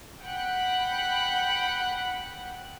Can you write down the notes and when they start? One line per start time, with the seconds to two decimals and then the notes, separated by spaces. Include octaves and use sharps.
0.24 F#5 G5 B5 F#6